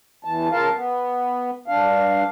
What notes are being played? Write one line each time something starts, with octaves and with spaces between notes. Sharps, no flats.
E2 E3 A5
C#3 F4 A#4 F5 A5
B3
G2 D4 F5